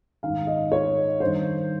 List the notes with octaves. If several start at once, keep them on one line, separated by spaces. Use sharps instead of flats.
G#2 D#3 F5
D#5
C#5
G2 C5
D#3